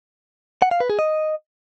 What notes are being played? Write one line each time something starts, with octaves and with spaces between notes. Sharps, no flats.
F#5
F5
B4
G#4
D#5